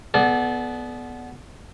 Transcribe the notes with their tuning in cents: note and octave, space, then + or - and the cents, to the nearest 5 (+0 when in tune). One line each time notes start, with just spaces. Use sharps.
B3 +0 A4 -40 D5 +0